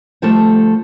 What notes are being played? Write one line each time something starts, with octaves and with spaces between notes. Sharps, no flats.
D2 F3 G3 A3 A4 A5